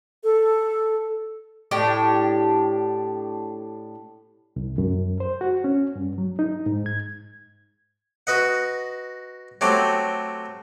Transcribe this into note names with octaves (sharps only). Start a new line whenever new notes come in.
A4
A2 D4 G4
C2
F#2
C5
F#4
C#4
G2
F#3
D#4
G#2
G#6
F#4 B4 D#5 F#5
F#3 A3 C4 G4 D6